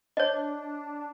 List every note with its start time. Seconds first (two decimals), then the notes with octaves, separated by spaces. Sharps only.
0.17 D4 C#5 D#5